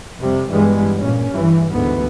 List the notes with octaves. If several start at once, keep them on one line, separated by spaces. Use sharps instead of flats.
F2 C3 G3
G2 E3 G3 G#3 B3
A#2 C#4
G2 E3
D2 G#2 E3 B3